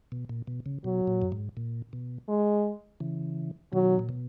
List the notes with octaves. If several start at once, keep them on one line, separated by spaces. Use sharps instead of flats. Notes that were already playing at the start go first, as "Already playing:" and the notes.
B2
A#2
B2
C#3
B2 F#3
A#2
F#2
G#2
A#2
B2
G#3
C#3 E3
B2 D#3 F#3
A#2
B2